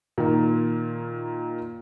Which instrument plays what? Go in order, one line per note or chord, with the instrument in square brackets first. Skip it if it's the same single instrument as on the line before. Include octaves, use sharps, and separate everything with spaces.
[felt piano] A#2 D#3 A#3